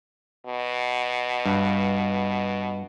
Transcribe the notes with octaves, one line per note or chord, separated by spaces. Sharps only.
B2
G2